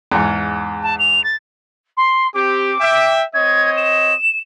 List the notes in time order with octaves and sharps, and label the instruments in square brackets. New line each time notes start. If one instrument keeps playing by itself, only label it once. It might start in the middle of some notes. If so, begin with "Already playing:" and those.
[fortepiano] E2 G#2
[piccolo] A5
F7
A6
C6
[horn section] C4 G4 [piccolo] D6
[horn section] E5 G5
[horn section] C4 C#5 D#5 [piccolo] G#6
[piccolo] E7